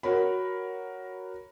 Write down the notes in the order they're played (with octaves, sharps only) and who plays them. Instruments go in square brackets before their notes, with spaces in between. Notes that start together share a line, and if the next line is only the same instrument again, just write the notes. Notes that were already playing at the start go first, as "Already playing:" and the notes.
[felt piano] F#4 A#4 C#5 B5